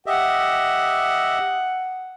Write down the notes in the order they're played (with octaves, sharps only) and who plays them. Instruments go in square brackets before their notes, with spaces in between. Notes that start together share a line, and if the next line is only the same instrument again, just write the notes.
[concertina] G4 D#5 E5 [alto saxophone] F#5